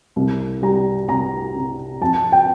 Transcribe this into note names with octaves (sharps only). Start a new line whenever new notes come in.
C2
G3 A#5
C2 A#5
C3
F2 A5
G5